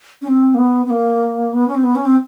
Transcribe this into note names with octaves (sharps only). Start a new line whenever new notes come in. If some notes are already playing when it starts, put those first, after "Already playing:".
C#4
C4
A#3
B3
B3
A#3
B3
C#4
C4
B3
C#4
C4